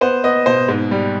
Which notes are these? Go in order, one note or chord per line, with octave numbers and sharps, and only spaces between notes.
B3 C5
B3 D#5
B2 C5
G#2
G3